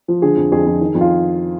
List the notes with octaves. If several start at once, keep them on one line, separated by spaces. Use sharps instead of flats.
F3
D3 G#4
F2
F2 G#4
F2
D#3
F2
F4